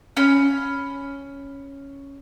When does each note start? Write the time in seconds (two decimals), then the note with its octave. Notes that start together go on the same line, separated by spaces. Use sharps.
0.17 C#4 B5